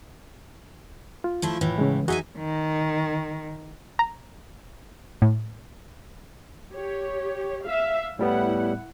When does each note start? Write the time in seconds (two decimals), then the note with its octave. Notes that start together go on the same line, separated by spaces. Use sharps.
1.24 F4
1.42 F3 A3 E4
1.61 A2 E3
1.78 C#3 G#3
2.08 D#4 F#4 G#4 E5 G#5
2.38 D#3
3.99 A#5
5.22 A2
6.73 G4 C#5
7.65 E5 F5
8.19 A2 G3 B3 E4 F#5